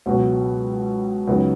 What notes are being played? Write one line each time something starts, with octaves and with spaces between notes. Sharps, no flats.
C#2 B2 F#3 B3 F#4
C#2 C#3 F#3 B3 D#4